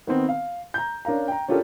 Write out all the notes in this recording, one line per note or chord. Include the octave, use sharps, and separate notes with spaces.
D#3 B3 C4
F5
A#5 G6
C#4 D4 A#4 F5 A#5
G5 A#5
C#4 D4 F4 G4 A4 A#4